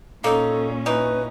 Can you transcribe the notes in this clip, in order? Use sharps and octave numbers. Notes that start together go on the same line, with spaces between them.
A#2 A#3 C#4 D#4 A4
E3 D#4 B4